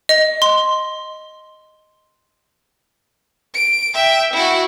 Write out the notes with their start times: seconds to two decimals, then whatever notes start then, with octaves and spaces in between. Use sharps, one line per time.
0.09 D#5
0.42 C6
3.54 D7
3.94 E5 G5
4.33 E4 F#4